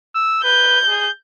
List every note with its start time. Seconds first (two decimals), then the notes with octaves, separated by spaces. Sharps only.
0.15 E6
0.44 B4 G6
0.88 G#4